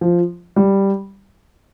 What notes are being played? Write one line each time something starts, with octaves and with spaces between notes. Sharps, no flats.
F3
G3